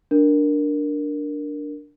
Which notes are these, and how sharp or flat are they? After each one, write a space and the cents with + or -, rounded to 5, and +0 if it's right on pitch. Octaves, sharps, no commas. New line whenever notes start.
D4 +0 A#4 +0